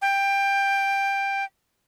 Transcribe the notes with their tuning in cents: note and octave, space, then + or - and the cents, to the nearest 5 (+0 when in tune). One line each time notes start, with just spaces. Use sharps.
G5 +15